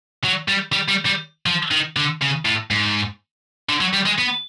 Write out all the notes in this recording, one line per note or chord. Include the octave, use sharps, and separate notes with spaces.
F#3
G3
G3
G3
G3
F3
D#3
D3
C#3
A2
G#2
D3
F#3
G3
G#3
B3